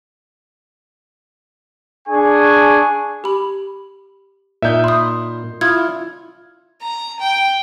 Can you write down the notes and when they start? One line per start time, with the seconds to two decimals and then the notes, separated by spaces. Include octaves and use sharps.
2.08 D4 G#4 G#5 C#6
3.24 G4 B5
4.62 A#2 D#4 E5 G6
4.84 B5 C6 D#6
5.61 E4 F4 D#6 F6 G#6
6.81 A#5
7.20 G5